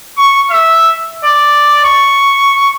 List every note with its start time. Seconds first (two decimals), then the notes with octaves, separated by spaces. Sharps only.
0.18 C#6
0.51 E5
1.25 D5
1.84 C#6